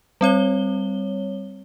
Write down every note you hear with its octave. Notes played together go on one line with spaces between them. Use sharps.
G3 C4 C#5 G7